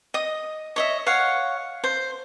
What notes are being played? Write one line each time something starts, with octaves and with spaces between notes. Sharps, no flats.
D#5 D#6
C#5 D#5 E5
C#5 F5 F#5
C5